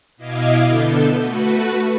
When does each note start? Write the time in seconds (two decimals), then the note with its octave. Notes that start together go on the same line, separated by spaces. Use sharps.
0.17 B2 E4 D#5 F5 D6 G#6
0.66 D3 B3 A4 G6
1.16 A3 F#4 B4